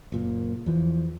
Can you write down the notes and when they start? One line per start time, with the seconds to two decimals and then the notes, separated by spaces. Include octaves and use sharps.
0.12 F#1 A#2
0.66 E2 E3 F3